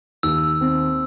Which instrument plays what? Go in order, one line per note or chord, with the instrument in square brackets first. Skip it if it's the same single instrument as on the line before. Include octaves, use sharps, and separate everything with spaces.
[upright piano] D#2 [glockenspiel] E6
[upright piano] C4